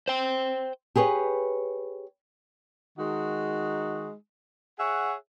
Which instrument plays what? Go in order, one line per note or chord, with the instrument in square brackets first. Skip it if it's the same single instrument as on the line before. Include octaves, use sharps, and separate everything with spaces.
[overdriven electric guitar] C5 G5
[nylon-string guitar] G4 G#4 B4 C#5
[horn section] D#3 G#3 D#4 F#4
G#4 C#5 E5 F#5